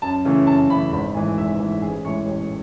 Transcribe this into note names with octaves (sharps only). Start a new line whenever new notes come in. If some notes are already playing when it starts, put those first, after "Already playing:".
F#2 A5
C#3 E3 A3
F#2 A5
C#3 E3 A3 B5
G#1 B5
G#2 E3 A3 G#5
G#1 E5
E5
G#2 E3 A3
A1 G#4
A2 E3 G#3 C#5
A1